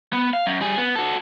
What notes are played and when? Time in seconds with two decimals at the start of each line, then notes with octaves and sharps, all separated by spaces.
0.13 B3
0.33 F5
0.46 F#2
0.61 G3 G#4
0.77 B3
0.96 F#4 A4